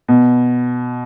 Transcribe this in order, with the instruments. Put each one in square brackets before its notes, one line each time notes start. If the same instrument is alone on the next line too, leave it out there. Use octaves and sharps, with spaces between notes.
[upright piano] B2